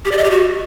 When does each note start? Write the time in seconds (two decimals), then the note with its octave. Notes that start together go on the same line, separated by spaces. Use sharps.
0.05 G4
0.11 D5
0.18 D#5
0.24 G4
0.31 F#4